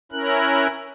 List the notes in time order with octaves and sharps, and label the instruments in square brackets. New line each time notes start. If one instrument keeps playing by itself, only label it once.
[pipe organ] C#4 E4 A#4 F#6